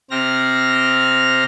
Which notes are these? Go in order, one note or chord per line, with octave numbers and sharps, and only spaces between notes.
C3 C4 F6 A#6